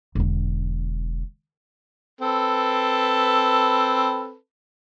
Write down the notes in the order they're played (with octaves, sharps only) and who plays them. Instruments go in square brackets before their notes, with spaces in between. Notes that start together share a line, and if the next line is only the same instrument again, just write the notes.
[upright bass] E1 D3
[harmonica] C4 A4 B4